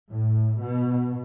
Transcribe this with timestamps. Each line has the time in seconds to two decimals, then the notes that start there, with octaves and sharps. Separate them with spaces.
0.10 A2
0.62 B2